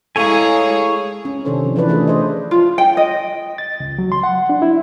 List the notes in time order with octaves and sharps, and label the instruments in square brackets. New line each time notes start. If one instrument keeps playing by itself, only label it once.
[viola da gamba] G#3 E4 G#4 [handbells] A4 F5 A#5 [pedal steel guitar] C#5 G#5
[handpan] C#4
C3 D#3 D4 A4 C5
F3
E3 F3 D4 B4 D5
A3 C#4 D4 G#4 A4
C5 D#5
[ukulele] F4
G5
D#5
[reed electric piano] A6
C#2
F#3
C6
F#5
D4
E4